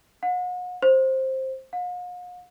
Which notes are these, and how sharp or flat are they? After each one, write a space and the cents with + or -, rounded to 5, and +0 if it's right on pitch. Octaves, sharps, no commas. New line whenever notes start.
F#5 -40
C5 +10
F5 +45